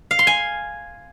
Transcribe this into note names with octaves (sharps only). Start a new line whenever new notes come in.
F5
C6
G#5